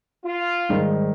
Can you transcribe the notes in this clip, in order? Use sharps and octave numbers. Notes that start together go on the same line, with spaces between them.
F4
G#2 D#3 G3